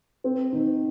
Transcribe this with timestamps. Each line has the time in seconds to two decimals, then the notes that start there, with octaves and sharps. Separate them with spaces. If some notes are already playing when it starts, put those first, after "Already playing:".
0.24 C4
0.52 D#3